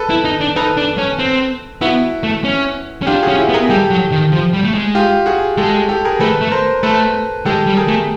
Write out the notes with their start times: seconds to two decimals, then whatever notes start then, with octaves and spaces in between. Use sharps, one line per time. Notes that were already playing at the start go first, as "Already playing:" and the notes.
Already playing: A4 B4
0.10 E4
0.25 D#4
0.41 D4
0.56 D#4 A4 B4
0.77 D4
0.98 C#4
1.19 C4
1.81 B3 E4 F#4
2.23 A3
2.44 C#4
3.02 C#4
3.07 D4 F4 G4
3.23 F#4 G#4
3.28 C#4
3.38 E4 F#4
3.49 B3
3.54 G#4 A#4
3.70 G3 G4 A4
3.90 F#3
4.12 D#3
4.32 F3
4.53 G3
4.64 A3
4.74 G#3
4.95 F4 G4
5.26 F#4 G#4
5.58 G#3 G4 A4
5.89 G4 A4
6.05 G#4 A#4
6.20 A3 A4 B4
6.41 A3
6.51 A#4 C5
6.83 A3 A4 B4
7.46 G#3 G4 A4
7.66 G3
7.77 G#4 A#4
7.88 A3